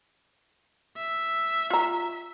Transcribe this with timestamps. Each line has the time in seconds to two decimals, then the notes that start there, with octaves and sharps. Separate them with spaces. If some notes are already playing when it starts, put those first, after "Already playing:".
0.97 E5
1.70 F4 A#5